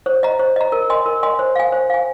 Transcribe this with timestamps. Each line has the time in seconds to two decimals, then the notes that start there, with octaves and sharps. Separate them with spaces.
0.06 C5
0.23 D#5 A#5
0.39 C5
0.56 D#5 A#5
0.72 A#4
0.90 D#5 G#5 C6
1.06 A#4
1.23 D#5 G#5 C6
1.39 C5
1.55 F5 G#5
1.72 C5
1.90 F5 G#5